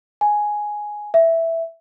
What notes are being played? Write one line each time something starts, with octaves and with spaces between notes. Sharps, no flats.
G#5
E5